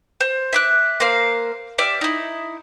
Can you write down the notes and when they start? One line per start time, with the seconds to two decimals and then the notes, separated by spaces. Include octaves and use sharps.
0.21 C5
0.53 E5 D6 F#6
1.00 A#3 C5 F5
1.78 G4 D5 E5 F6
2.01 D#4 E4